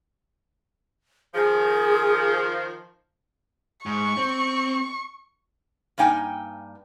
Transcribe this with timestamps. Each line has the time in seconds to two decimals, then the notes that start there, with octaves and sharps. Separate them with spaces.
1.35 D#3 F3 G#4
3.86 G#2 C#6
4.17 C4
5.98 G2 A#3 D#4 G5 G#5